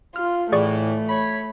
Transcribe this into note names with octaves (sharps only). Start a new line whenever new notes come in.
F4 F6
A2 E3 A3 G#4 D5 C#6
C#5 B5